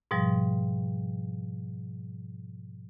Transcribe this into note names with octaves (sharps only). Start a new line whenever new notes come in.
G#2 B2 F3 G3